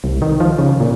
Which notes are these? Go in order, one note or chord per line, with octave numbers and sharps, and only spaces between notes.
C2
D#3
F3
C#3
A#2